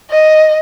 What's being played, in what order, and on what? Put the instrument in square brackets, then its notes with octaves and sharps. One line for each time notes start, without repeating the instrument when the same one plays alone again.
[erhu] D#5